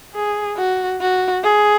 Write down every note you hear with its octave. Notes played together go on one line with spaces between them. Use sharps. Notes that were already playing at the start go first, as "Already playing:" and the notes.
G#4
F#4
F#4
G#4